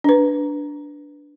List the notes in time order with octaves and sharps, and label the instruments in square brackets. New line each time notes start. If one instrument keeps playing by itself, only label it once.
[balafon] D4 B4